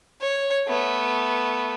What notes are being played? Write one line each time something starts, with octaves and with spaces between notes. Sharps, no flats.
C#5
A3 B3